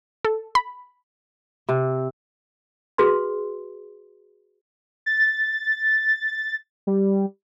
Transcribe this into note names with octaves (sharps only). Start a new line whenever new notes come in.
A4
B5
C3
F#4 G#4 B4 C6
A6
G3